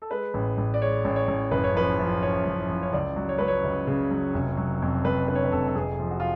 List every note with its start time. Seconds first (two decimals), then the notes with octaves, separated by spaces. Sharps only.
0.02 A4
0.10 G#3 B4
0.34 A1
0.58 A1
0.74 D5
0.82 G#3 C#5
1.05 A1
1.16 C#5
1.28 A1
1.51 F#1 B4
1.64 C#5
1.75 F3 B4
1.99 F3
2.23 F#2 C#5
2.46 F#1
2.69 F3
2.83 C#5
2.93 C#2 D5
3.16 F#3
3.29 C#5
3.38 F#3 B4
3.48 C#5
3.64 C#2
3.87 C#3
4.11 F#3
4.34 F1
4.57 F#3
4.82 F2
5.05 F2 B4
5.28 D3 B4
5.35 C#5
5.44 B4
5.52 F1 A4
5.68 A4
5.75 F2 G#4
6.00 F3
6.11 F#4
6.20 F4